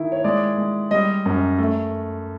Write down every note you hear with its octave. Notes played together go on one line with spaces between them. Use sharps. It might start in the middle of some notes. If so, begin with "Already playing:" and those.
Already playing: D#3 E4
C#5
G#3 D5
G#3
G3 D#5
F#2
A3